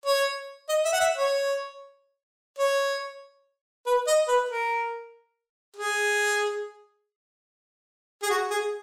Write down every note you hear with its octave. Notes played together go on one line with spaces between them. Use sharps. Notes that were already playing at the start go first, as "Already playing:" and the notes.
C#5
D#5
E5
F#5
E5
C#5
C#5
B4
D#5
B4
A#4
G#4
G#4
F#4
G#4